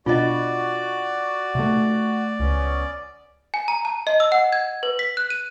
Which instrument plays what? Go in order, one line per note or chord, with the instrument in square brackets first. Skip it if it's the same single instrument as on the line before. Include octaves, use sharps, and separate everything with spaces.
[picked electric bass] B2 D4 [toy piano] F4 D#5 [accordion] F#4 [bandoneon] D5
[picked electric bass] C3 A3
[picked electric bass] C#2 [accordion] B3 C#4
[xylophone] G#5
A#5
A5
D#5
E6
F#5
G#6
B4
B6
F#6
D#7